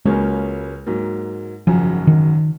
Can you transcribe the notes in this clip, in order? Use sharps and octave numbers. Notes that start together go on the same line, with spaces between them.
C#2 C#3 F#3 G#3 A#3 C#4
G#2 F#3 A#3
G#1 F#2 C#3 F3 F#3
D#3